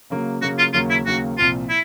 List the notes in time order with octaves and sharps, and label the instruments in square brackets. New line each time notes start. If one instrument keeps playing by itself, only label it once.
[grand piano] C#3 F#3 A#3
[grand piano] C#3 F#3 A#3 [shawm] F#4
[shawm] F4
[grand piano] D#2 C#3 F#3 A#3 [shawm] F4
[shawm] E4
[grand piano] D#2 C#3 F#3 A#3 [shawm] F#4
[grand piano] C2 A#2 F3 [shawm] F4
[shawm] E4